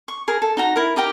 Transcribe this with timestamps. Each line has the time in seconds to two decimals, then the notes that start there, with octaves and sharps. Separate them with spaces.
0.08 C#6
0.28 G#4 A#4
0.42 A4
0.57 D#4 F#4 A#5
0.76 E4 A#4
0.96 D#4 G4 A#4 G5